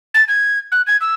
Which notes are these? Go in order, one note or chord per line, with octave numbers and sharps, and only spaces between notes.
A6
G#6
F#6
G#6
E6